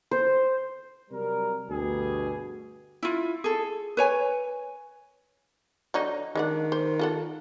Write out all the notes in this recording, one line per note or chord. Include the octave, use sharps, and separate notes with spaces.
C5
C3 F#3 G3 A#4
D2 G2 B2 G4 G#4
E4 F4
G#4 A4
B4 C#5 G#5
D3 F#3 D#4
D#3 G#3 D4 F#5
C5
F4 A4 F#5